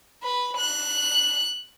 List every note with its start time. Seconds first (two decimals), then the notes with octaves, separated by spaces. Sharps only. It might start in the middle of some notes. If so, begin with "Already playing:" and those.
0.23 B4
0.57 F#6